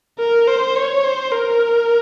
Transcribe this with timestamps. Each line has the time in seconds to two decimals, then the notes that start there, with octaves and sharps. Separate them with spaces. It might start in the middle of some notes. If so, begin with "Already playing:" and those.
0.19 A#4
0.47 C5
0.76 C#5
1.04 C5
1.32 A#4